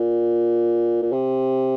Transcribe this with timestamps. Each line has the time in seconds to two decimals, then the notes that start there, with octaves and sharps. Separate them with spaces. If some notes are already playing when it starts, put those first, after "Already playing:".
Already playing: A#2
1.02 A#2
1.12 C3